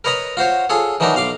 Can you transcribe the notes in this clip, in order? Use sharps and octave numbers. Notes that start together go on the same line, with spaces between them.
A#4 B4 C#5 D#5 A#5 B5
F4 F#4 C5 C#5
F4 G#4 A4 C#5
D#3 E3 F#3 D4 D#4 A#4
B1 F5 C6 D6